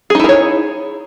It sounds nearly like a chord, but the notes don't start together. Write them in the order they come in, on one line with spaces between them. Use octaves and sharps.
G#4 D#4 E4 A#4 C#5